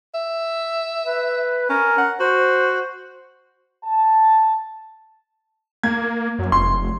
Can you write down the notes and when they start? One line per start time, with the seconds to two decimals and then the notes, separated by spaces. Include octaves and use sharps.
0.14 E5
1.06 B4
1.69 C#4 A#4
1.98 F#5
2.20 F#4 C5
3.84 A5
5.83 A#3 G#6
6.39 F#2
6.52 F1 C6